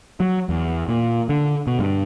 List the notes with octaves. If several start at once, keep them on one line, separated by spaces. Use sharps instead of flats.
F#3
E2
A#2
D3
B2
G2